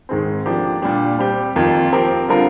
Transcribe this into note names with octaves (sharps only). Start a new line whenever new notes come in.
G#2 D#3 G#3 C4
D3 F3 A#3 D4 G4
A#2 G3 D4 G4
G3 C4 G4
F2 D#3 A#3 F4
F3 C4 G4 A#4
D3 G3 C4 F4 A#4